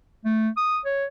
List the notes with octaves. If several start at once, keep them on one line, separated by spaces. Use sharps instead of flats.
A3
D#6
C#5